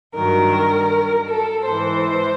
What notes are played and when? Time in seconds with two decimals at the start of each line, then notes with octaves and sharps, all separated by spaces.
0.15 G2 D#3 F#3 A#4
1.28 A4
1.65 G#2 E3 C5